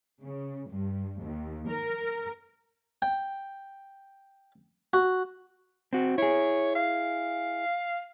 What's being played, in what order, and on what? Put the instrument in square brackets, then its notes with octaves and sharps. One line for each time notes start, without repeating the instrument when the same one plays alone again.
[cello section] C#3
G2
D#2
A#4
[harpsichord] G5
F#4
[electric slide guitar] C4 F#4
[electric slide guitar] E4 G#4 [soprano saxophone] C#5
[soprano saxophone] F5